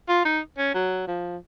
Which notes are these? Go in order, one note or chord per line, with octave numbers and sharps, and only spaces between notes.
F4
D#4
C#4
F#3
F3